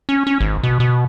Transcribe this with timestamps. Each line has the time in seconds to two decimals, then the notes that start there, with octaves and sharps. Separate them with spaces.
0.09 C#4
0.27 C#4
0.40 G#1
0.63 B2
0.80 B2